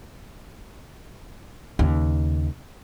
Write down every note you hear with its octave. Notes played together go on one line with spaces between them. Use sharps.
D#2 C#3